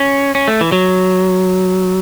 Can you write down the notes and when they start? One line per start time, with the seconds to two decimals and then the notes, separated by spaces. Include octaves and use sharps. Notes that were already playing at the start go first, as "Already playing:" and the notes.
Already playing: C#4
0.35 C#4
0.48 A3
0.61 E3
0.72 F#3